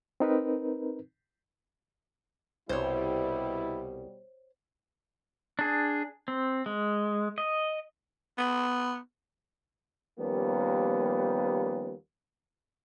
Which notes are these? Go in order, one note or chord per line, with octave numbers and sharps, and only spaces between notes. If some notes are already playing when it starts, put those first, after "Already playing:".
C4 D#4 A#4 B4
C2 B2 G3 E4 C5 C#5
D4 G#4
C4
G#3
D#5
B3
D#2 F3 G3 A#3 B3 C#4